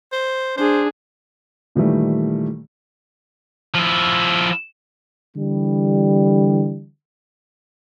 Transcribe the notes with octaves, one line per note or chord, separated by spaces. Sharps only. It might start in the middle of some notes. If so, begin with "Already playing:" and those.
C5
D4 G#4 C5
A#2 D#3 E3 G3 A3
F3 E4
D3 E3 G3